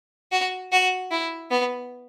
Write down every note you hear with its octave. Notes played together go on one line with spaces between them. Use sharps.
F#4
F#4
E4
B3